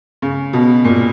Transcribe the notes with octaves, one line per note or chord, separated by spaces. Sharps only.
C#3
B2
A#2